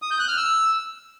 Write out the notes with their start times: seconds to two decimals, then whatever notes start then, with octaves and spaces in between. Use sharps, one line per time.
0.02 D#6
0.11 G6
0.20 F#6
0.28 F6
0.37 E6